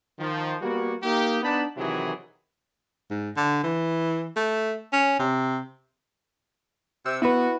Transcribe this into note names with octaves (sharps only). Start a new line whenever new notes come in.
D#3 F3
G3 A#3 B3 F#4
A#3 D#4 G4
B3 D4 D#4 A5 B5
C3 D#3 E3 F#3 E4 G#4
G#2
D3
E3
A3
C#4
C3
C3 E6
B3 E4 F#4 B4